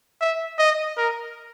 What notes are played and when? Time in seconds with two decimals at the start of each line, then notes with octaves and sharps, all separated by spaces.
0.21 E5
0.59 D#5
0.97 A#4